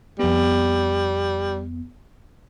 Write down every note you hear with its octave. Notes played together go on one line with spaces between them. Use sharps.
F2 G3 B3